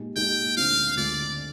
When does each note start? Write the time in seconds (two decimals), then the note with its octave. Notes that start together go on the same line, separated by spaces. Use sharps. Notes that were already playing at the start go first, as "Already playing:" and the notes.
Already playing: A#2 G#3 D#4 G4
0.16 A#2 G#3 D#4 G4 G5
0.56 D2 D3 G#3 C4 F4 F5
0.96 D2 D3 G#3 C4 F4 D5